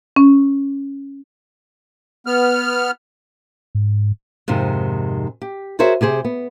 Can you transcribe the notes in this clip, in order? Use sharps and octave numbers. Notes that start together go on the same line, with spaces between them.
C#4
B3 F6
G#2
F2 G#2 C3 D#3
G4
F#4 G#4 A#4 C5 C#5 E5
C3 G4 G#4 C5
B3